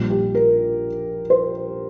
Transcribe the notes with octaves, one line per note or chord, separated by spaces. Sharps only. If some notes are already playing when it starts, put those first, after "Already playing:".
Already playing: A#1 A#2 G3
G4
A#4
C5